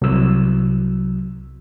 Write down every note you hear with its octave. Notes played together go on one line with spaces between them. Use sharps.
C2 F#3 E6